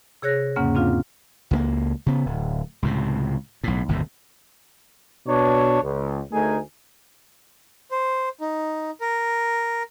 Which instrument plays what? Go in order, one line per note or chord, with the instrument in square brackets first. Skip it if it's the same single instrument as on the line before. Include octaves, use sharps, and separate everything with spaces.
[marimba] C3 G#4 C#5 F#6 A#6
E2 G#2 C#3 A#3 C#4 F#5
C4 D4 F4 F5
[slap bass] C#2 G3 A#3
C#3 B3
D1
C#2 A2 C3
B1 A2
G1 D#2 A2 C3
[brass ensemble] B2 D4 C#5
C#2
D2 A3 D#4 G#4 A#4 G#5
[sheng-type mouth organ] C5
D#4
A#4